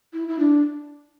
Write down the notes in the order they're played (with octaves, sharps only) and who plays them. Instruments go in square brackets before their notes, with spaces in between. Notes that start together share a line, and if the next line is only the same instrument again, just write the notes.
[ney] E4
E4
D4